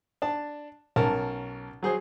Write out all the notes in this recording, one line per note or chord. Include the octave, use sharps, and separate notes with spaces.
D4 A5
B1 C#4 A#4 A5
F#3 G#4 C5